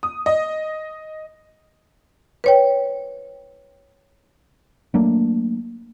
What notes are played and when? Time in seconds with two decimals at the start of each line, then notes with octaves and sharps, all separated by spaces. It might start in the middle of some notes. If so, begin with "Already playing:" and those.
0.03 D#6
0.26 D#5
2.44 B4 C#5 G5
4.94 F#3 A3 A#3 D4